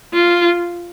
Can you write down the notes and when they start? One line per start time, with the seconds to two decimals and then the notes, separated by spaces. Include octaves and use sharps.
0.14 F4